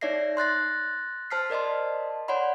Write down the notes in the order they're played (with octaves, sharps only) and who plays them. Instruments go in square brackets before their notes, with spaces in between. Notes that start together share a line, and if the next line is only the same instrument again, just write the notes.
[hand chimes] D#4 C#5 D5 E5 A#6 C7
C6 F#6 A6 A#6
C5 A5 F6 B6 C7
A#4 D5 D#5 A5 C6
C#5 D5 F#5 B5 C6